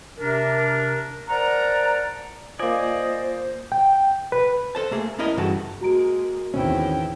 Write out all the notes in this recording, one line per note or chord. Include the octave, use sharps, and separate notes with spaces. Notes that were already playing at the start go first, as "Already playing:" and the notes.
C3 D4 A#4
A#4 C5 D5 F#5 A5 A#5
A#3 F4 C5 D5 D#5 G#5
G5
B4
A4 C5 A5
A3 A#3 G#4
B3 C#4 E4 A#4 D#5
G2 C#3 E3 F#4 A4
G#3 A#3 F#4 A#5 D7
E2 A2 D#3 C4 C#4 E4 G5